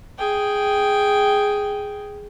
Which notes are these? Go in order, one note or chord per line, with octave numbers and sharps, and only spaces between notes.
G#4 G5